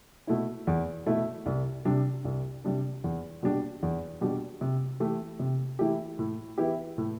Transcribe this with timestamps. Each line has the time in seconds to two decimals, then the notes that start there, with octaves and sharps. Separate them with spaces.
0.27 B2 A3 E4
0.67 E2
1.07 B2 A3 E4
1.46 C2
1.85 C3 G3 D4
2.25 C2
2.64 C3 G3 D4
3.04 E2
3.43 B2 G3 D4 G4
3.83 E2
4.21 B2 G3 D4 G4
4.61 C3
5.00 E3 A3 E4 G4
5.40 C3
5.79 E3 A3 E4 G4
6.19 A2
6.58 E3 B3 E4 G4
6.98 A2